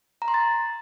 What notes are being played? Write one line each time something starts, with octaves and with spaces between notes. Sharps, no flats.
A#5
C6
A6